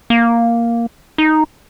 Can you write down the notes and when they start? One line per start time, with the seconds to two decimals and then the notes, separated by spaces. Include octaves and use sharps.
0.10 A#3
1.18 D#4